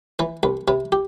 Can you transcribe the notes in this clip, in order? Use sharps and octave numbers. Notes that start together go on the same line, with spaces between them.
E3 B4
C2 B4
C3 B4
G4